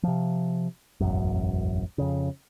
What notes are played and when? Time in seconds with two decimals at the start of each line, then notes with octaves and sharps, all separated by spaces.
0.03 C3 F3
1.00 E1 A1 F#2
1.98 F2 C#3